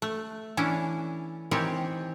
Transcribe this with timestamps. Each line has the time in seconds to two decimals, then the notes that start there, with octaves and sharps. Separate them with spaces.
0.02 A3
0.57 E3 C#4 D4 E4
1.51 D#3 E3 C4 G4 C#5